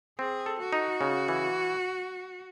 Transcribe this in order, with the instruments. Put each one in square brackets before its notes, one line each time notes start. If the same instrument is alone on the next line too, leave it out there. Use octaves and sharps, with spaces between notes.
[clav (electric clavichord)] C4 [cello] G#4
[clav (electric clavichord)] A4
[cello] F#4
[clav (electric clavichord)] D#4
C#3
E3